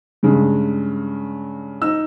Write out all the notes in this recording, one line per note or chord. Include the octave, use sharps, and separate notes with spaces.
G2 C#3 G#3
D#4 E6